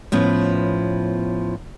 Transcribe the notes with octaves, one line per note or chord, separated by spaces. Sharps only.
A2 F3 B3 C#4